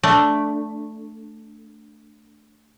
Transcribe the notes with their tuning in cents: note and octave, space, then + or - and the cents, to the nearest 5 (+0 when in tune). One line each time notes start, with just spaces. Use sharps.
A3 +0 D4 +0